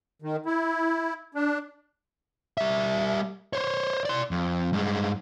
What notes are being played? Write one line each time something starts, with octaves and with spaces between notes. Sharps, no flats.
D#3
E4
D4
G3 E5
C5 C#5
D5 C6
F2
G2 G#3